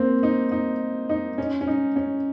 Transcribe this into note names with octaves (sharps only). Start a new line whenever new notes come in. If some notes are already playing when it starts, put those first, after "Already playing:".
Already playing: A#3 C4
D#4
D#4
D#4
C#4
C#4
D#4
C#4